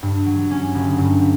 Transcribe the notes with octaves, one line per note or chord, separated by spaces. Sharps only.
G2
F#3
C#4
G1
G2